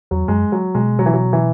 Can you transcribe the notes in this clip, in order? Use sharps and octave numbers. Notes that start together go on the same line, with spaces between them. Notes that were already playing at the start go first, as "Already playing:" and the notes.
E2 F#3
F#2 G#3
F#3
B2 G#3
F#3
E3
F#3
E3